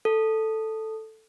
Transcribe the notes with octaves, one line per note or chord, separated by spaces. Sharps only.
A4